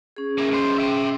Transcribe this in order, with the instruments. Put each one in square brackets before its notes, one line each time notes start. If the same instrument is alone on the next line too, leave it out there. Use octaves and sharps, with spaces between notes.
[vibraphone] C#4 G#4
[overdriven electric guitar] A#3 E4
B1 C5
E5 G5